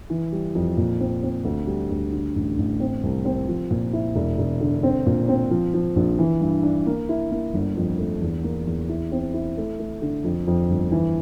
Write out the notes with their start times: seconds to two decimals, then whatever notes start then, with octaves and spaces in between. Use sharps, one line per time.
0.10 E3
0.32 G3
0.55 F2
0.77 A#2
1.00 C4
1.23 C4
1.45 D2
1.67 G3
1.90 D2
2.12 D3
2.35 A1
2.58 A1
2.80 C4
3.03 C2
3.25 C4
3.48 F3
3.71 A#2
3.93 E4
4.15 E1
4.38 E1
4.61 D3
4.83 C4
5.06 A#2
5.28 C4
5.51 F3
5.74 F3
5.96 A#1
6.19 E3
6.41 G2
6.63 D4
6.86 A#3
7.09 E4
7.31 A#3
7.54 G1
7.77 F2
7.99 A3
8.21 E2
8.44 A#3
8.67 E2
8.89 E4
9.12 C4
9.34 E4
9.57 A3
9.79 A3
10.02 D3
10.24 F2
10.47 F2
10.70 G1
10.92 E3